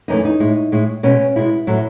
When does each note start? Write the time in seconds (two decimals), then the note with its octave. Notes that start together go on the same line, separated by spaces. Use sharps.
0.08 F#2 E3 A3 D#4
0.25 D#4
0.40 A2 G#3
0.72 A2 G#3
1.03 B2 G#3 C#4
1.36 B2 G#3 E4
1.67 A2 F#3 A3 E4